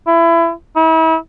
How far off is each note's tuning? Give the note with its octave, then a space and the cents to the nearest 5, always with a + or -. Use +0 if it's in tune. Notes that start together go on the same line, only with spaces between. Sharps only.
E4 +25
E4 -40